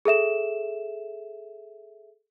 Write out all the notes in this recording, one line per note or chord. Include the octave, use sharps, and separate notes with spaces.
G#4 A4 E5 E7